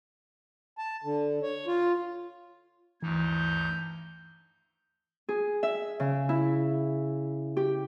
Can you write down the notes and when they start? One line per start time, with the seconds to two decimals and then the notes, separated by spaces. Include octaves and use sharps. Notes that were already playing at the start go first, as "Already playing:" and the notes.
0.78 A5
1.04 D3
1.43 C#5
1.67 F4
3.03 D2 G2 E3 D#4 G6
5.29 G#4
5.63 E5
6.00 C#3
6.29 E4
7.57 G4